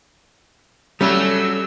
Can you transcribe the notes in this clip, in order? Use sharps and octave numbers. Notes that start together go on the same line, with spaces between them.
F#3 G3 A3 C#4 E6